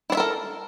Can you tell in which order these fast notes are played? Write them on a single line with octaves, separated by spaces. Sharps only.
E4 D4 E5 A#4 A4